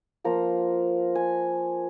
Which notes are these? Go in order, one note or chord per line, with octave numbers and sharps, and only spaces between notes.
F3 A#3 F4 A#5
G#5